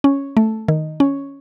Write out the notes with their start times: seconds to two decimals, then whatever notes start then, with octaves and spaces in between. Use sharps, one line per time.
0.04 C#4
0.37 A3
0.68 D#3
1.00 C#4